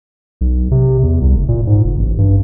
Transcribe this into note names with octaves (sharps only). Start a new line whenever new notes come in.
B1
C3
E2
C2
F#1
A#2
G#2
F#1
A1
G2